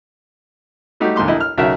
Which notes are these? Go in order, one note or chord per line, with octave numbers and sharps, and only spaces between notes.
G3 A3 D#4 F#4 G4
D2 G#2 A#3 C6 D6
A#1 E4 D#5
F6
B1 C#3 F#4 A#4 E5